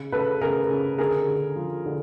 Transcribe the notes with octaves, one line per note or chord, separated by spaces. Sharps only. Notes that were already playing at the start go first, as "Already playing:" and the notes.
Already playing: C#3
C#3 A4 B4
C#3 G#4 A#4
C#3
D3 G#4 A#4
D3
F3
D3